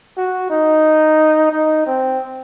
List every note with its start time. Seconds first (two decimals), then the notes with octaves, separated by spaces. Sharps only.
0.17 F#4
0.50 D#4
1.52 D#4
1.86 C4